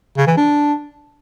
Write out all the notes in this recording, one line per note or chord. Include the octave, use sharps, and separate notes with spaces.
C#3
E3
D4